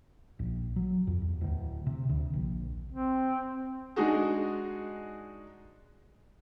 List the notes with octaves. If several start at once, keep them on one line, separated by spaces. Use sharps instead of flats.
A#1
F#3
F2
E2
D1
C3
D2
A#1
C4
G#3 D4 D#4 F#4 G#4